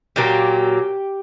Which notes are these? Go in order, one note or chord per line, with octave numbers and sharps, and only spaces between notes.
A#2 F#3 A#3 G4